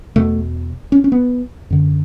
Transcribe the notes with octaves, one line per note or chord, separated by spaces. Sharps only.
E2 B2 A3
C#4
C#4
B3
F#2 D3